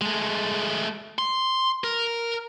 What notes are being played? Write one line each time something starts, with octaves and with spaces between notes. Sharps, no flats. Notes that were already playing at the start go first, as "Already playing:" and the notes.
G#3 A3
C6
A#4